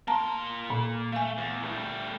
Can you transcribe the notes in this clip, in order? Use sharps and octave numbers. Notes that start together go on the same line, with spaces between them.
A#3 A5 A#5 C6
A#2
A3 F5 G#5
E2
G3 A3